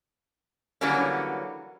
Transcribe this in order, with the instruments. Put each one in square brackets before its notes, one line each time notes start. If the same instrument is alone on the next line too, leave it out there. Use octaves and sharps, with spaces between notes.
[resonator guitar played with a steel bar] D3 E3 F#3 G3 A#3 C#4